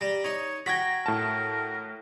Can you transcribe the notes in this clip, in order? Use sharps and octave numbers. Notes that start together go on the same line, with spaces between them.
G3 A#5
D#4 C#5
F#4 G5 A#5 G#6 A#6 B6
A2 A#4 A5